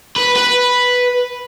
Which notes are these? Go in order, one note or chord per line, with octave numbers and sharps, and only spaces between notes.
B4
B4